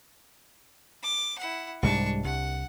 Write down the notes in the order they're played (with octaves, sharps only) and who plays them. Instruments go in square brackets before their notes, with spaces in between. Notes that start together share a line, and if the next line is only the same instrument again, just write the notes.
[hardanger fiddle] D6
E4 F#5
[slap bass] C2 G#2 G3 [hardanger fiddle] D4 C#6
[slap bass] C2 [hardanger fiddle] F#5